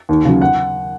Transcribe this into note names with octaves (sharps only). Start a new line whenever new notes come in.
D#2
C#3 F#3
F#5